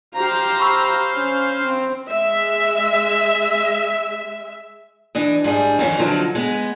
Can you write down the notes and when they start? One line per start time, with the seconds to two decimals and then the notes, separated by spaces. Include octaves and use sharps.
0.14 G4 C5 F5 A#5
0.59 B5 C#6 E6
1.13 C#4
1.63 C4
2.09 G#3 E5
5.15 E3 D4 D#5
5.44 G#2 G3 D4 G#4
5.78 F2 D#3 E3 C#4
5.98 D3 F3 F#3 C4 D#4 F4
6.35 G#3 B3